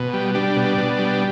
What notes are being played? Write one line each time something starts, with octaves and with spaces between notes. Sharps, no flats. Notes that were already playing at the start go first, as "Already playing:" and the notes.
Already playing: B2
G3
G3 D4
B2
B2
G3